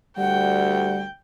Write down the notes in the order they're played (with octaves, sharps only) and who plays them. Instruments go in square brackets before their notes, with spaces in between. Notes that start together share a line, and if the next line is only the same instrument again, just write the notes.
[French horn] D2 [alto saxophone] G3 [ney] F#5 [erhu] G5